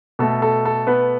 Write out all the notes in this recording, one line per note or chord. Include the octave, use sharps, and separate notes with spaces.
B2 A3 A4
A4
A4
B3 B4